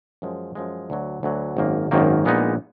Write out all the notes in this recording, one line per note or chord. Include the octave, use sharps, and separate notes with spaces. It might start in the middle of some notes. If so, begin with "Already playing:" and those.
F#2 F3 G#3
F#2 F3 G#3
D2 D3 F#3
D2 D3 F#3
G#1 F#2 D#3 A#3
G#1 F#2 D#3 A#3
A#1 A#2 G#3 B3 D#4